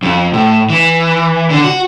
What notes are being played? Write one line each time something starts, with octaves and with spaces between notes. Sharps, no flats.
F2
A2
E3
D3
F#4